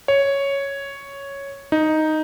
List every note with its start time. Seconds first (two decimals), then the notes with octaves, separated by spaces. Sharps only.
0.08 C#5
1.72 D#4